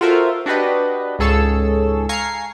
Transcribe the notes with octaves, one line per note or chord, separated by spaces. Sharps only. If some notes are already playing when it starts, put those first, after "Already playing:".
F4 F#4 A4 A#4 C5 E5
D4 F#4 G4 B4 D#5
C#2 G#2 G#4 A4 C#5 E6
F5 G#5 A#5 C#6 G#6 C7